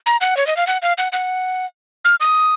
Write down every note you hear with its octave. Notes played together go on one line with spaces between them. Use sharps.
A#5
F#5
C#5
D#5
F5
F#5
F5
F#5
F#5
F6
D#6